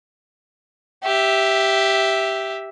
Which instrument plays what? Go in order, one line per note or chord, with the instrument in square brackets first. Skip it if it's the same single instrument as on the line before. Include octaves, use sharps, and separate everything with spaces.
[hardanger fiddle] G4 E5